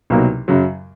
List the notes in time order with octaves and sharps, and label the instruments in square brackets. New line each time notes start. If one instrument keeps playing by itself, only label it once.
[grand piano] C2 B2 F#3 A#3 D#4
F#2 C#3 F#3